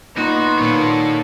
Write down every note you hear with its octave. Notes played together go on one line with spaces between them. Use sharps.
A#2 B3 D#4 F#4 B4 C6
A#2 D#3 A4 C#5